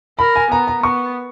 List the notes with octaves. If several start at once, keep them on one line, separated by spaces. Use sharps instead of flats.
A#4 B5
G#5
B3 A#5
A#5
B3 C#6